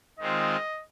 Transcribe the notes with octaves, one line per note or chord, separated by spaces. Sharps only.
D#3 G#3 C4 F4 D#5